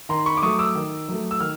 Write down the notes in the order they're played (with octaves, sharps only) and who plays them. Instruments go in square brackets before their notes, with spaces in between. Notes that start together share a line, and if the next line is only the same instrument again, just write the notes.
[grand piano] D#3 A#5 C6
B5 C#6
D6
F#3 A3 C#6 D#6
D6 E6
D#3
F#3 A3
E6
D#3 F6